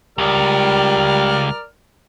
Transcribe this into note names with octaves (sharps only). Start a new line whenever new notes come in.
C#2 G3 A#4 D5 F6